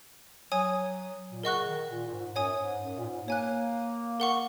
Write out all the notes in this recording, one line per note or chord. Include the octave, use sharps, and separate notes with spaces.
F#3 C#5 G#5 D#6
A#2
C#3 A#4 D#5 F#5 C#6 F#6
D#3
A#2
A#2
G#2
F#2 C#5 G#5 D#6
G#2
F#2
A#2
G#2
A#3 C#5 G#5 F#6
A#4 F#5 C#6